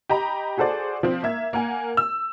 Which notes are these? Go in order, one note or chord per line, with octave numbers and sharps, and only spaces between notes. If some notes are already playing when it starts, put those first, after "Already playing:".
G4 D#5 A#5 B5
F#4 G#4 A4 C5 D5
F3 C4
A#3 E5 G#6
A#3 A#4 F#5 G#5
E6